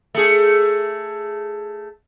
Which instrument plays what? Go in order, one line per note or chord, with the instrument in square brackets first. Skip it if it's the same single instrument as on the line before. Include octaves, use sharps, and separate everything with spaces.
[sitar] A3 G#4